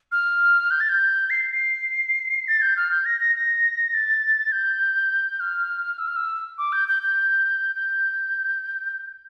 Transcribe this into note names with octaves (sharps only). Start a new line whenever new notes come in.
F6
G6
A6
G6
C7
C7
A6
G6
F6
G6
A#6
A#6
A#6
A6
G6
F6
E6
F6
E6
D6
G6
G6
G6
G6